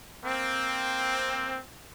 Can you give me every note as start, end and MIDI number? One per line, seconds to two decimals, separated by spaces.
0.24 1.59 58
0.24 1.59 60